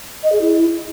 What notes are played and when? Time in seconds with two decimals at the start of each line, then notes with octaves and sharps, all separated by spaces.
0.23 D#5
0.32 G#4
0.41 E4